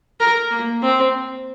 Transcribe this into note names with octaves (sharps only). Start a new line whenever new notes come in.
A#4
A#3
C4